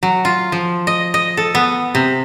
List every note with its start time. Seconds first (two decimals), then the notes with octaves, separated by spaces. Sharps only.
0.03 F#3
0.25 F4
0.52 F3
0.87 D#5
1.14 D#5
1.37 A4
1.55 B3
1.95 C3